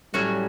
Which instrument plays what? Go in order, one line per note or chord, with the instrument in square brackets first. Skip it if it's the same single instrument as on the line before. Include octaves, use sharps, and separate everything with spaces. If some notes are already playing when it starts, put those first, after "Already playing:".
[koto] A2 F#3 C#4 F#4 [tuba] G3